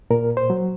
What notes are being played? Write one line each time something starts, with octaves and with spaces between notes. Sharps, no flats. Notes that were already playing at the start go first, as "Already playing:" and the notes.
A#2 A#4
C5
F#3